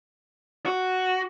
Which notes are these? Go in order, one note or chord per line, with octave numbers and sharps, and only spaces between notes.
F#4